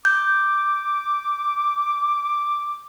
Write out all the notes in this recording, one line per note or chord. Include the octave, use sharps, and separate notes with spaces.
D6 G6